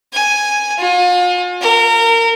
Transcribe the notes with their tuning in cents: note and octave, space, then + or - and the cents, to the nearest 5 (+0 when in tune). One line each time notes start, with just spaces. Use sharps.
G#5 +0
F4 +40
A#4 -25